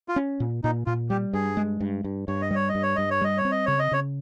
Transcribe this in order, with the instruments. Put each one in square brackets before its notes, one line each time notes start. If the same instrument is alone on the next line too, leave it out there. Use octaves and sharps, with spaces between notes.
[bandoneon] F4
[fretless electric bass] C#4
A#2
[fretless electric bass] A#2 [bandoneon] D#4
[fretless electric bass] A#2 [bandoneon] F4
[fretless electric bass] G3 [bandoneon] G4
[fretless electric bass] G2 [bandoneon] G#4
[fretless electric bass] G#3
G2
G2
[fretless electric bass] G2 [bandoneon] C#5
[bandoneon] D#5
[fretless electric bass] G3 [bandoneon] C#5
[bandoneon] D#5
[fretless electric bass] G2
[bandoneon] C#5
[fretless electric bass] G2 [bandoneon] D#5
[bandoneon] C#5
[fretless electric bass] G3 [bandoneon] D#5
[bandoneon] C#5
[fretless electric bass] C4
[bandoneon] D#5
[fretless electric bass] C#3 [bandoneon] C#5
[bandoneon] D#5
[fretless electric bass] C#3 [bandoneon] C#5